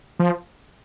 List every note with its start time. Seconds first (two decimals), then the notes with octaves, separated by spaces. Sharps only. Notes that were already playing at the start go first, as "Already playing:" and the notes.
0.20 F3